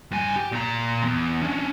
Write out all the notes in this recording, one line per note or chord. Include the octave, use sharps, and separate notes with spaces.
G2 G#5
G4
A#2 A#5
E2
C#4 D4